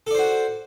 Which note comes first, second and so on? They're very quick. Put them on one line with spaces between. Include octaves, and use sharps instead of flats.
A4 D5 C5 F#4